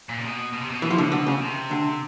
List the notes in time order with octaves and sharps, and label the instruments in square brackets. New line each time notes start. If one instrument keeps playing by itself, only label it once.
[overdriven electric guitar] A#2
C3
B2
B2
C3
B2
[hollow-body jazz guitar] E3
F3
D3 E3
D3
C#3
[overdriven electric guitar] C3
[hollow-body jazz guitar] D3